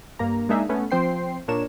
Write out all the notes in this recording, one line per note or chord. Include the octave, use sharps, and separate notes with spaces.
G2 A#3 A#5
G#3 A#3 D4 D#4 G#4 E5
A3 B3 C#4
F3 C4 C5 G5 C6 C7
A#2 D4 A#4 C#5 E7